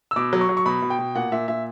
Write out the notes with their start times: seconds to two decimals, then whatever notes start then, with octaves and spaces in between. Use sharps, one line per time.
0.11 E6
0.16 B2 D6
0.33 F#3
0.41 C#6
0.49 F#3
0.57 C#6
0.66 B2 B5
0.82 B2
0.90 G5
0.99 B2
1.15 A#2 F#5
1.32 A#2 E5
1.48 A#2 E5